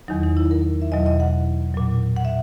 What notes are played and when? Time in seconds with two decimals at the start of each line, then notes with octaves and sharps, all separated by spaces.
0.08 E2 D#3 F#3 D#4
0.23 D#4
0.37 E4
0.51 A#4
0.82 E5
0.92 E2 B2 F#3 D#5
1.06 D#5
1.20 F#5
1.74 A#2 F#3
2.16 F#5
2.25 E5